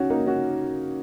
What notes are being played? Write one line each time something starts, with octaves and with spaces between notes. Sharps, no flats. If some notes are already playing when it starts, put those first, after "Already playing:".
Already playing: C#4 D#4 F#4
A#3 D#4
C#4 F#4